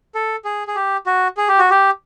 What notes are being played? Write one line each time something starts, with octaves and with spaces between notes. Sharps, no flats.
A4
G#4
G#4
G4
F#4
G#4
G4
F#4
G4